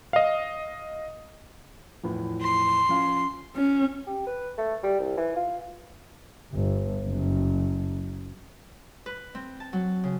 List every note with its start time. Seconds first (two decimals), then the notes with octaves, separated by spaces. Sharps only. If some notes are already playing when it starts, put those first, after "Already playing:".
0.13 D#5 F5
2.03 E2 A2 F3
2.41 C6
2.89 F3 C#4 F5
3.56 C#4
4.07 G4
4.27 B4
4.58 A3
4.83 G3
5.00 C2
5.17 E3
5.36 F4
6.53 G1
7.05 F#1
9.06 B4
9.35 C4
9.60 A5
9.73 F#3
10.04 C#3